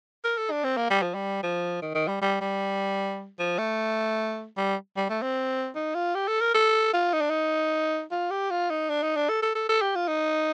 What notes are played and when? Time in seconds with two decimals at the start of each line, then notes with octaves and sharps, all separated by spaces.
0.24 A#4
0.37 A4
0.51 D4
0.64 C4
0.77 A#3
0.90 G3
1.03 F3
1.15 G3
1.43 F3
1.82 D#3
1.95 D#3
2.08 G3
2.22 G3
2.41 G3
3.39 F3
3.59 A3
4.57 G3
4.97 G3
5.10 A3
5.22 C4
5.75 D#4
5.95 F4
6.15 G4
6.28 A4
6.41 A#4
6.54 A4
6.93 F4
7.13 D#4
7.21 D4
7.30 D#4
8.11 F4
8.31 G4
8.51 F4
8.70 D#4
8.90 D4
9.03 D#4
9.16 D4
9.29 A4
9.43 A4
9.55 A4
9.69 A4
9.81 G4
9.95 F4
10.08 D#4